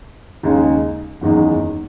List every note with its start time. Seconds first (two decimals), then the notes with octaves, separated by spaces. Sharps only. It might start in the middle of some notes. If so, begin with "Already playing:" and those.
0.43 D#2 C#3 G#3 D#4
1.21 F#1 E2 D#3 G#3 D#4